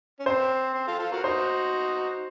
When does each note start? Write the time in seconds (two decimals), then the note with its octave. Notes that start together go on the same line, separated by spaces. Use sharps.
0.19 C#4
0.26 C4 C5
0.74 C4
0.88 F4 A4
0.99 F4 A4
1.12 F#4 A#4
1.24 D#4 F#4 C5